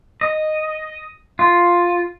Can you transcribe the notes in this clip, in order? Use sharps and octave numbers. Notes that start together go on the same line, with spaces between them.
D#5
F4